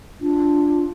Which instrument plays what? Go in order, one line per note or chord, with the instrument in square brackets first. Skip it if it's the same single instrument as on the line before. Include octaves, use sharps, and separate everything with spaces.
[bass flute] D4 [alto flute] F4